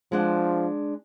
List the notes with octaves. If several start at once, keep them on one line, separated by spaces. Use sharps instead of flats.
F3 G#3 D4 F#5